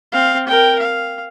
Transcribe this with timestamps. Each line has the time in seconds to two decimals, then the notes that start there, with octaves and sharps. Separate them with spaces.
0.12 C4 F5
0.47 A#4 G5
0.79 F5